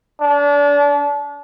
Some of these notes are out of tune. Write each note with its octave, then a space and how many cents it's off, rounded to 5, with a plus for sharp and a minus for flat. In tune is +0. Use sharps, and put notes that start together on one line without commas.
D4 -30